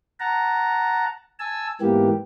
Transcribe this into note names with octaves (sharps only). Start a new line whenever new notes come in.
F#5 A5 A#5
G#5 A5 E6
G#2 E3 A#3 B3 G4